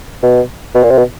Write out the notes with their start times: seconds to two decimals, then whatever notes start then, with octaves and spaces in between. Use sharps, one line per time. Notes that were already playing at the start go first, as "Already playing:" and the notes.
0.23 B2
0.75 B2
0.83 A#2
0.91 C3
0.98 B2